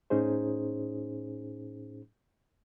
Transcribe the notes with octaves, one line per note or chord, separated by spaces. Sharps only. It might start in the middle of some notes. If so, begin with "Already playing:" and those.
A2 C#4 D#4 G#4 C5